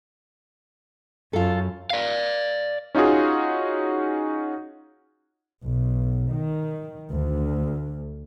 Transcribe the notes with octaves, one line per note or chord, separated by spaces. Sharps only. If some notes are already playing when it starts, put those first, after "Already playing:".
F#2 F4 A4
D5 F5
C#4 D#4 F4 F#4 G#4
B1
D#3
D2